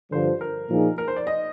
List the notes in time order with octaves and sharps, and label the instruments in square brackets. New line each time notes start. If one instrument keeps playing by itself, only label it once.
[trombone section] G2 D3 F3 [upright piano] C5
[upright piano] A#4
[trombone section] A#2 F3 A#3 D#4 G#4
[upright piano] A#4
C5
D5
D#5